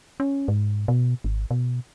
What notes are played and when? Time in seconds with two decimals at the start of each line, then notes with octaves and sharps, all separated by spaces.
0.20 C#4
0.48 G#2
0.88 B2
1.24 G#1
1.51 B2